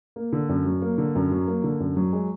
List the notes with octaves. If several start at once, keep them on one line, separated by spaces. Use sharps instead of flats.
A#3
D3
F#2
F#3
A#3
D3
F#2
F#3
A#3
D3
F#2
F#3
G#3